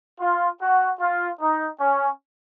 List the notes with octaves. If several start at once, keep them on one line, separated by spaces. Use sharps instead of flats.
F4
F#4
F4
D#4
C#4